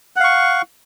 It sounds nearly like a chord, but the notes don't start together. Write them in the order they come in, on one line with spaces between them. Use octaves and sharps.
F#5 F5 C#6